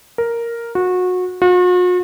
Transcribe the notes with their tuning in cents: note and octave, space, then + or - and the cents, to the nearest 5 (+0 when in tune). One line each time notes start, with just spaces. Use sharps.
A#4 +0
F#4 -25
F#4 -45